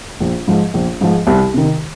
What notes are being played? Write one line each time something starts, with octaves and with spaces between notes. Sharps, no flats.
A#1
G#2 F3 G#3
A#1
G#2 F3 G#3
C2
C3 D#3